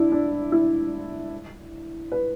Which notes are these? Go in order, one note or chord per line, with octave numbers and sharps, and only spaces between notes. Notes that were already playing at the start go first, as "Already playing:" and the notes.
Already playing: D4 E4
D4
E4
B4